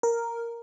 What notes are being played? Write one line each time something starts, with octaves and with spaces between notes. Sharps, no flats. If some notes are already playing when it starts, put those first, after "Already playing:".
A#4